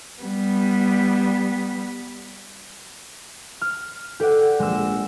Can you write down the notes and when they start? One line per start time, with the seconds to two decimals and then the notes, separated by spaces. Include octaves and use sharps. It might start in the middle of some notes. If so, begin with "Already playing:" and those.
0.22 G3 B3
3.61 F6
4.20 G4 A4 D5 F#5
4.60 A#1 G#3 E6